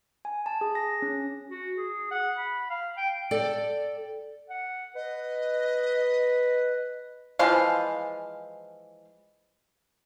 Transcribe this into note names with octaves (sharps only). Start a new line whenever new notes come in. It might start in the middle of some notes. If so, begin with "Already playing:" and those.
G#5
A5
G#4
A#6
C#4
F#4
G#4
F#5
B5
F5
G5
A4 D5 G5
F#5
B4 D#5
E3 F3 G#3 F5